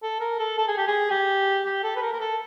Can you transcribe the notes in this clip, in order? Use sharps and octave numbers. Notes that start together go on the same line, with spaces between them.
A4
A#4
A4
A4
G#4
G4
G#4
G4
G4
A4
B4
A#4
A#4
A4